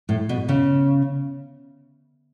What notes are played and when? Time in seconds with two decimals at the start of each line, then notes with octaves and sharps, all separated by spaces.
0.09 A2
0.29 B2
0.49 C#3